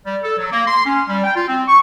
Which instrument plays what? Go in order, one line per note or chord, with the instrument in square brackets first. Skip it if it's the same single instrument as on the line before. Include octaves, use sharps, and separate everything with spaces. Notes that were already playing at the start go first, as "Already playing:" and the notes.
[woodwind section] G3
A4
F#3
A#3
C6
C#4
G3
G5
F4
C4
C#6